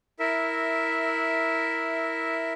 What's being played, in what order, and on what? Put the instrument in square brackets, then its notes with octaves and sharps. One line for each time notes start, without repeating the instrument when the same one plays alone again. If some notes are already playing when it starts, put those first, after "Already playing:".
[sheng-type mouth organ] E4 A#4 E5